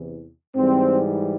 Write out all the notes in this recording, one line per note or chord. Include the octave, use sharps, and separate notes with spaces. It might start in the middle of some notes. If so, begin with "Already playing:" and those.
Already playing: E2 C3 E3
G#2 E3 G3 C4